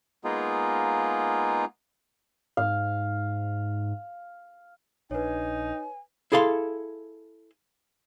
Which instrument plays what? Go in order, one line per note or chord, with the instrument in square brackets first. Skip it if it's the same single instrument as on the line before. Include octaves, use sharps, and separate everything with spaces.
[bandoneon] G#3 A#3 B3 D#4 F4 G#4
[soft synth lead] G#2 [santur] F5
[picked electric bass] A#1 D4 [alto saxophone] D#4 [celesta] B4 C#5 [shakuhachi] G#5
[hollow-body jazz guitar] E4 G#4 A4 F5 B5 C6